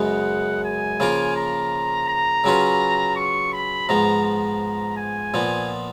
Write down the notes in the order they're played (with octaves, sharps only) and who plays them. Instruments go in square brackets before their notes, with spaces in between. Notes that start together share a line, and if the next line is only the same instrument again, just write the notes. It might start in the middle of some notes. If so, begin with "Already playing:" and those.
Already playing: [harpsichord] F#2 C#3 G#3 B3 D#4 [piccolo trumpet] F#5
[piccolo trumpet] G#5
[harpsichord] C#3 F3 A#3 F4 A#4
[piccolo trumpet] A#5
A#5
[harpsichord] C#3 F#3 C#4 F4 B4
[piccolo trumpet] C#6
B5
[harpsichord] G#2 F3 B3 [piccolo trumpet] A#5
[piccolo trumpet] A#5
G#5
[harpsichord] A#2 F3 B3